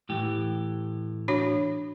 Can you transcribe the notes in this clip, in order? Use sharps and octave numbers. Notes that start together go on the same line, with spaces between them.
A2 E3 G4
D4 F#4 C#5